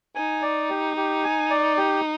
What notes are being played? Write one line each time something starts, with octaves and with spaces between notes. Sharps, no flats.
D#4 G#5
D5
G4
G4
G#5
D5
G4